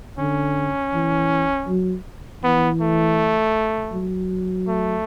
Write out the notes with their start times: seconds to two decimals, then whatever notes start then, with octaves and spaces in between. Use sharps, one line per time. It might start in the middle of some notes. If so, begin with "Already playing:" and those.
0.18 D3 C#4
0.93 E3
1.68 F#3
2.43 E3 B3
2.81 A3
3.92 F#3
4.68 A3